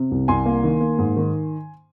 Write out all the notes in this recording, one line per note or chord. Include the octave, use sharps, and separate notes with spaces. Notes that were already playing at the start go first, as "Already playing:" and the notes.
Already playing: C3
C2
C2 G#5 C6
A#3
D#3
A#3
G#2
D#3